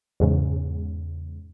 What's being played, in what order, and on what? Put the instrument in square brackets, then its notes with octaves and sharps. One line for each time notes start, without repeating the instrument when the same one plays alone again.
[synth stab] E2 G#2 C#3